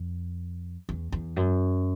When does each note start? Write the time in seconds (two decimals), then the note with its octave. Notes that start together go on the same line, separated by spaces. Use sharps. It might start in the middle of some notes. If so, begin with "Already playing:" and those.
Already playing: F2
0.89 E2
1.12 E2
1.36 F#2